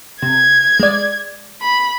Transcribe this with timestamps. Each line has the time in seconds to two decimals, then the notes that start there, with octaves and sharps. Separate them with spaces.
0.22 C3 G#6
0.80 G#3 D5
1.61 B5